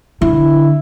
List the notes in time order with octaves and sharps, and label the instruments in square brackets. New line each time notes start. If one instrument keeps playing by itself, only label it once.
[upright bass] D3 [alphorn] E4